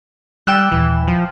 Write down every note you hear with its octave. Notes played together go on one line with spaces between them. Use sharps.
G3 G5 E6 F#6
D#1 E3
F3